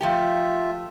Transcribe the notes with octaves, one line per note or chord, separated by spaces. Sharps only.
F3 A3 F4 G4 E5